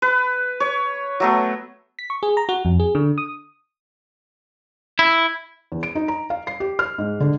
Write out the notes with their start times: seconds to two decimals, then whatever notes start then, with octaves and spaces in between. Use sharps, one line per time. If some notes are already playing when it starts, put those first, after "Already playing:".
0.02 B4
0.60 C#5
1.20 F#3 A3 B3
1.99 B6
2.10 C#6
2.23 G#4
2.37 A#5
2.49 F#4
2.65 F2
2.80 G#4
2.95 D3
3.18 D#6
4.99 E4
5.72 E2
5.83 D7
5.95 D#4
6.08 A#5
6.30 F5
6.47 C7
6.60 G4
6.79 F6
6.98 G#2
7.20 D3